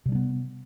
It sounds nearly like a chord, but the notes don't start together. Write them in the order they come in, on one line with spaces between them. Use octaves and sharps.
C3 G3 D4 B3